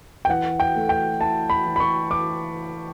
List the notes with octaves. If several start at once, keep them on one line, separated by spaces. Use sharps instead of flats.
G5
E3 F#5
G5
A3
G5
E4 A5
B5
E3
B5
C#6
E3 D6